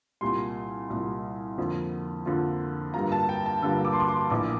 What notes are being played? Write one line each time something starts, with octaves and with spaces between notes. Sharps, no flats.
C2 A#2 G3 C6
C2 A#2 G3
F2 D3 F3 A#3 F4
F2 D3 F3 A#3 F4
G2 D3 G3 A#3 F4 A#5
A5
G5
A5
G2 D3 G3 A#3 F4 E6
D6
C6
D6
C6
A#1 A2 E3 A#3 D6